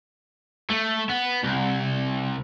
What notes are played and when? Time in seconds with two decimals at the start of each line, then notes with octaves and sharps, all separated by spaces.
0.70 A3
1.09 B3
1.44 C2